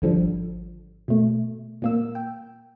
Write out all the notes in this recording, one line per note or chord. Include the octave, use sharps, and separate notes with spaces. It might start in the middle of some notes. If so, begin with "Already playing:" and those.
G#1 D3 F3 G3
B2 A3
A#2 A#3 E6
G5